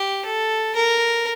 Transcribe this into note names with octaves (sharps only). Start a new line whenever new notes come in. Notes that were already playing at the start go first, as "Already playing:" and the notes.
Already playing: G4
A4
A#4